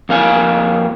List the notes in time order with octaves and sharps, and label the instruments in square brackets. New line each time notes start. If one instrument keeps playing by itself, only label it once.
[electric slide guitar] F2 A#3 F5 G#5